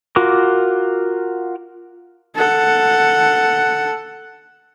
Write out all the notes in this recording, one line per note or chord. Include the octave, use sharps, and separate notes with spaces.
F4 F#4 A#4 D6
A4 F#5